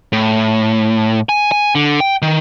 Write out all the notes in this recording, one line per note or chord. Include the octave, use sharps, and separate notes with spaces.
A2
G#5
G#5
D3
G5
D#3